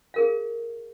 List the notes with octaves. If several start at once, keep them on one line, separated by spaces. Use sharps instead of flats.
G#4 A#4 F5